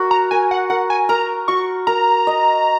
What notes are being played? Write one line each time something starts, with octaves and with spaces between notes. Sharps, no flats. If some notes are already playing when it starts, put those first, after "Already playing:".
Already playing: F#4 A#4
A#5
A#4 G#5
F#5
A#4 F#5
G#5
A#4 A#5
F#4 C#6
A#4 A#5
D#5